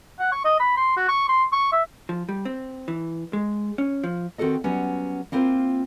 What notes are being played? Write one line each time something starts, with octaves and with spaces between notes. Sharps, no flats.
F#5
C#6
D#5
B5
C6
F#4
C#6
C6
C#6
E5
F3
G3
C4
E3
G#3
C#4
F3
D#3 C4 F#4 A4 D#5
F#3 G3 B3 C#4
A#3 C4 E4 F4 A#4 C5